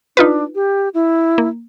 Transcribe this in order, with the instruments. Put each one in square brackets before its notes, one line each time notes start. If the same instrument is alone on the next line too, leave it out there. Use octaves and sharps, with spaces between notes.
[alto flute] D4 [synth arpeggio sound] D#4 F4 B4
[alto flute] G4
E4
[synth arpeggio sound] A#3